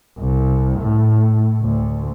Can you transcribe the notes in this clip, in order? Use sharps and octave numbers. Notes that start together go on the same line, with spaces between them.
C2
A2
D2